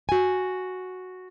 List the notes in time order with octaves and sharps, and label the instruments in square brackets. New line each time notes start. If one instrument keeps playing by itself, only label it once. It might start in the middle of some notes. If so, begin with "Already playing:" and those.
[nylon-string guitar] F#4 G#5